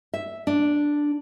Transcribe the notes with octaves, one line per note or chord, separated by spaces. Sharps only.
E5
D4